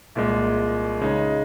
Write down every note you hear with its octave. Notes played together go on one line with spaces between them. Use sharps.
C2 A#2 G#3
C#3 G#3 D#4